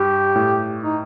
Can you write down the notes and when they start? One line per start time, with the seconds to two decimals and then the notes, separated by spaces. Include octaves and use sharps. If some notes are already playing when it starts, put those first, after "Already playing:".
Already playing: G2 G4
0.36 A2
0.83 D#4